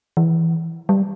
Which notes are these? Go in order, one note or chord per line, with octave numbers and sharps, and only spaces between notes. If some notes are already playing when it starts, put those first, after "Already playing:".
E3
G3